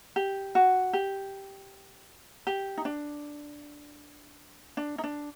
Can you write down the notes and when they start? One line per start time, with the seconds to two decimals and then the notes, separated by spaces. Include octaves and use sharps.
0.16 G4
0.55 F#4
0.93 G4
2.47 G4
2.77 D#4
2.85 D4
4.77 D4
4.98 D#4
5.04 D4